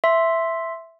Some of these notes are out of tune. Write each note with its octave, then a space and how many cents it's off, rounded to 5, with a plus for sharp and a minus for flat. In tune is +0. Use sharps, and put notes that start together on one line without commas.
E5 +0 C6 +0